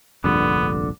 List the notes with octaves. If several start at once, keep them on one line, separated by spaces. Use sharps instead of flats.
F1 A#1 G2 D3 B3